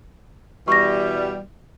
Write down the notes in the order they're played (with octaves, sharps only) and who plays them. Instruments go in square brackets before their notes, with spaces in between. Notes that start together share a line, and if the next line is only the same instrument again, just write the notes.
[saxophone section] B2 E3 G3 [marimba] C#6 A#6